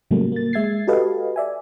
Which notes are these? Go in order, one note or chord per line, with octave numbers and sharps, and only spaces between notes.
A2 C#3 F#3 G3 A3 A#3
A#3 A6
G#3 E5 G#6 A6 C7
F#4 G4 A4 B4 D#5 F5
D5 E5 G#5